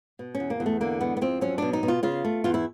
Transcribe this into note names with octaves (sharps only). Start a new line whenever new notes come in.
B2
C#4
E2
A#3
E2
A3
D3 A#3
G#3 B3
B3
F2 C4
F#3 C#4
B2 D4
D#4
B2
F4
C#3 F4
A3
E2 F4
E4